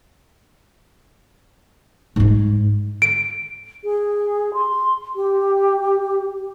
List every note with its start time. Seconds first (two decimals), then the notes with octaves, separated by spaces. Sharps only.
2.16 G#2 G#3
3.02 D7
3.84 G#4
4.54 C6
5.16 G4